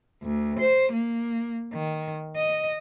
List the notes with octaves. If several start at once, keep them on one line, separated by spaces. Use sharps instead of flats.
D2
C5
A#3
D#3
D#5